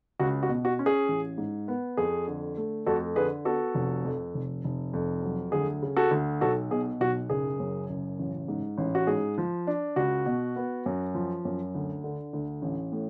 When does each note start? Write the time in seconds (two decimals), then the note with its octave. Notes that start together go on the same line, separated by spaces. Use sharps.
0.19 C#2 F#4
0.43 F#4
0.49 B2
0.65 F#4
0.79 C#4
0.86 G#4
1.08 A1
1.38 G#2
1.68 B3
1.97 F2 G#4
2.27 D3
2.57 A3
2.86 F2 F#4 A4
3.16 D3 G#4 B4
3.45 B3 F#4 A4
3.74 F1
4.04 F2
4.34 F1
4.64 F1
4.93 F2
5.23 F#3
5.52 D2 G#4
5.82 C#3
5.96 F#4 A4
6.11 D2
6.41 B1 F#4 A4
6.71 B2 G#4
7.00 B1 F#4
7.30 F#1 G#4
7.60 F#2
7.89 F#1
8.19 A1
8.48 G#2
8.78 A1
8.95 F#4
9.07 G#2 G#4
9.38 F3
9.67 D4
9.96 C#2 F#4
10.26 B2
10.56 B3
10.86 F#2
11.15 F3
11.45 F#2
11.75 D2
12.04 D3
12.33 D2
12.62 A1
12.92 A2